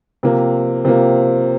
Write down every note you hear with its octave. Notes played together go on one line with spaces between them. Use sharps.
C3 F3 A#3
C3 F3 A#3